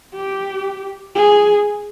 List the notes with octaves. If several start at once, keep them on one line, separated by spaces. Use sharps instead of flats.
G4
G#4